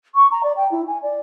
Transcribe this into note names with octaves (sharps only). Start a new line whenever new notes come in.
C#6
A#5
D5
G5
E4
G#5
D5